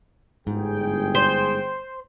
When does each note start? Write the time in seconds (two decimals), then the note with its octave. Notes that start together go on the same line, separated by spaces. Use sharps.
0.47 G1 G#2 G#4 G5
1.15 C5